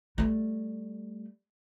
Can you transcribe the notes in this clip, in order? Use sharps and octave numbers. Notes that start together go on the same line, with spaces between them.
G3 A3